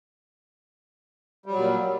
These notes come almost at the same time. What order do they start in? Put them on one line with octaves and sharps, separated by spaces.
G3 F#3 A#2